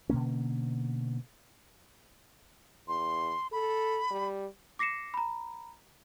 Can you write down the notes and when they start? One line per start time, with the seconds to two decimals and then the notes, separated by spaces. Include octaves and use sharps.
0.09 B2 D3 A#3 C#4
2.88 E2 C6
3.52 A4 B5
4.11 G3
4.79 D6 A#6 C7 C#7 E7
5.14 A#5 B5